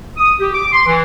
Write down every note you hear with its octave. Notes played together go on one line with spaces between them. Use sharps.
D#6
G4
D6
C6
E3